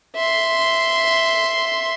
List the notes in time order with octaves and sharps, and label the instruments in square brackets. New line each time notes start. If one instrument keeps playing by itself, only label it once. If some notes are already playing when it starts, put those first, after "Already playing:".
[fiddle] E5 C6